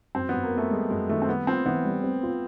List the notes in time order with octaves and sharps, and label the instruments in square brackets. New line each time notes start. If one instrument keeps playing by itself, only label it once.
[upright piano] F#2 [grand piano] C4
[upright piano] F#2 [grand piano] B3
[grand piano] A#3
[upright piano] B3
[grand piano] A3
[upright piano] G3 [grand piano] G#3
[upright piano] F#2 [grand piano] G#3
[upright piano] D#3 [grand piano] A3
[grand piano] C4
[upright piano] G3 [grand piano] B3
[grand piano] C4 [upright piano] F4
[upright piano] E3 [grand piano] B3
[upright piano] G3
C4
F4